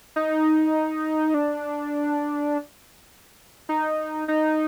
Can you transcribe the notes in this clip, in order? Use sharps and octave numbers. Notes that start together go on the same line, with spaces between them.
D#4
D4
D#4
D#4